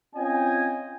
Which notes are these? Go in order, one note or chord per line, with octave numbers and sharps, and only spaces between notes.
C4 C#4 F4 D#5 G5 G#5